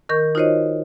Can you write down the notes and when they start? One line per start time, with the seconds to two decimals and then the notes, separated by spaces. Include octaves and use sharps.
0.09 D#3 A#4 C#6 G6
0.35 D#4 F4 F#4 C5 C#5 D#5